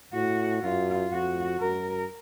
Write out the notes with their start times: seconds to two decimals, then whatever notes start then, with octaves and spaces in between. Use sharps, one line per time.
0.14 A2 F#4
0.63 F#2 F4
1.12 F2 F#4
1.61 F#2 A#4